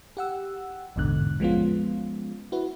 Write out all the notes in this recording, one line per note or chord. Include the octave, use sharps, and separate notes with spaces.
G4 F#5 E6
A1 E2 G#2 B2 D3 F#6
F3 G#3 B3 C#4 F4
E4 F#4 B4